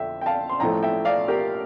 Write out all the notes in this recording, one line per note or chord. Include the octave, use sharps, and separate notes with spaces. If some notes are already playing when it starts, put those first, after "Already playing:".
Already playing: F2 D3 E5 G5
G5
F5 A5
C6
A1 A2 F3 A3 G5 A#5
E5 G5
D5 F5
G4 A#4